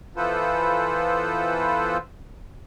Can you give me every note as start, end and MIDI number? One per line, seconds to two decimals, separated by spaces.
0.16 1.97 52
0.16 1.97 59
0.16 1.97 65
0.16 1.97 69
0.16 1.97 71
0.16 1.97 72